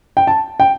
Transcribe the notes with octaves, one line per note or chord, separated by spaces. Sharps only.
G5
A5
G5